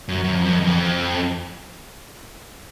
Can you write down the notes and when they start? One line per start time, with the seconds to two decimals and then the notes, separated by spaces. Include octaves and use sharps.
0.09 F#2
0.24 F#2
0.35 F2
0.45 F#2
0.53 F2
0.60 E2
0.67 F2